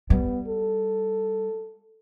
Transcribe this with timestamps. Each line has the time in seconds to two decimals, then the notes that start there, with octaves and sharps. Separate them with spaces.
0.10 G3 B3
0.48 A4